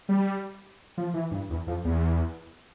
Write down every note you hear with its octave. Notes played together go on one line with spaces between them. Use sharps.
G3
F3
E3
G2
E2
F2
E2